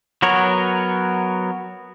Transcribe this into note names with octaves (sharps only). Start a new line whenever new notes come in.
F#3 B3 A#4 C#5